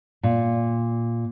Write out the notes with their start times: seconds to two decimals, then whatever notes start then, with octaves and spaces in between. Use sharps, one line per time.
0.23 A#2